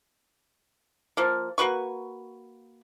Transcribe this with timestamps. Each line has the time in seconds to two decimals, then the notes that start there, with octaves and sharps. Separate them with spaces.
1.17 F3 A#3
1.58 A#3 F#4 B4 C#6